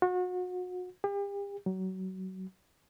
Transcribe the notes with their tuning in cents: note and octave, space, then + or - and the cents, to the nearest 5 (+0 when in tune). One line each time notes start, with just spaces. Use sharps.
F#4 -35
G4 +40
F#3 +25